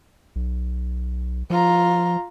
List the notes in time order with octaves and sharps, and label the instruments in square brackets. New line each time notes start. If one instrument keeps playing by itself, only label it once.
[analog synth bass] B1
[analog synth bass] F3 [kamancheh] F4 A#5